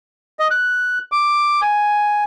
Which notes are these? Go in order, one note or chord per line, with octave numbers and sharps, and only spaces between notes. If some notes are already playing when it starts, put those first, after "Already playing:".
D#5
F#6
D6
G#5